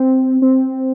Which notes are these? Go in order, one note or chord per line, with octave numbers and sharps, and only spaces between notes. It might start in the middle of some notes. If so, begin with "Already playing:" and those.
Already playing: C4
C4